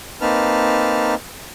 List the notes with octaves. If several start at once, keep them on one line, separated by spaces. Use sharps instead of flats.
A#3 C4 D#4 B4 A5 F6